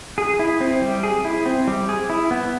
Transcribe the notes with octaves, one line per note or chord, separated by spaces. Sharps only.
G#4
E4
C4
G3
G#4
E4
C4
G3
G#4
E4
B3